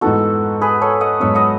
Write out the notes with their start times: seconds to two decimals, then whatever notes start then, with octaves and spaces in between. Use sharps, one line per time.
0.01 G#2 E3 B3 D#4 F#4 A4
0.61 G#4 B4
0.81 A4 C#5
1.01 D#5 F#5
1.20 G#2 F#3 B3 C#5 E5
1.35 D#5 F#5